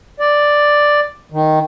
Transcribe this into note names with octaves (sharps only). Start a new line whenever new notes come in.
D5
D#3